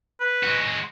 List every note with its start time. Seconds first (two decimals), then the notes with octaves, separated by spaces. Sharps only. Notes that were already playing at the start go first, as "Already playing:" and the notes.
0.20 B4
0.43 G#3 F#4